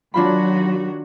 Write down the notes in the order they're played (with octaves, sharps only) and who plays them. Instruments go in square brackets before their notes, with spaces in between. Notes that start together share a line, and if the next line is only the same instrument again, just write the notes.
[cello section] D#3 F#3 F#4 [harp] D4 F4 B5